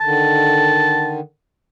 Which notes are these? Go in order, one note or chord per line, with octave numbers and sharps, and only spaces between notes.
D3 D#3 A5